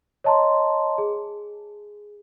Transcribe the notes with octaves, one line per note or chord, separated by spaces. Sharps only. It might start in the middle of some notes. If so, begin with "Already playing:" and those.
C#5 D#5 A5 A#5 C6
G#4